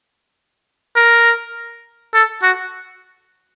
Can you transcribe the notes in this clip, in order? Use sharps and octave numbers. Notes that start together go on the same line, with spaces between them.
A#4
A4
F#4